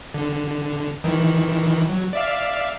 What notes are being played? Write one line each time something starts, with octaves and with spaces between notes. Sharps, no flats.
D3
D#3 E3
F#3
D5 E5 F5